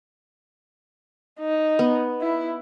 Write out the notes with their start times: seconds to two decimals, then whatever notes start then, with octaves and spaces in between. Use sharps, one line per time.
1.40 D#4
1.79 B3
2.21 E4